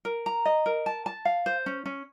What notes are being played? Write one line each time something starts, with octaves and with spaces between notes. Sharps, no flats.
A#4
A#5
D#5
A#4
A5
A5
F5
C5
C#4
C#4